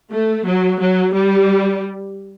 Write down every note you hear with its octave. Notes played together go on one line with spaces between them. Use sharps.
A3
F#3
F#3
G3